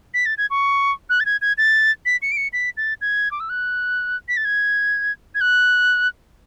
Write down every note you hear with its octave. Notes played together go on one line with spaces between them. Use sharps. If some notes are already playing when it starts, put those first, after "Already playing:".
B6
A6
G#6
C#6
F#6
A6
G#6
G#6
A6
B6
C#7
D7
C#7
B6
A6
G#6
D6
E6
F#6
B6
A6
G#6
G#6
F#6